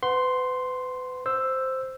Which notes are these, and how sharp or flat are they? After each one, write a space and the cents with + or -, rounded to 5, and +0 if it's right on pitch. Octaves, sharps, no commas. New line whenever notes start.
B4 +35 F#5 +0 C6 +0
C5 +0 E6 +5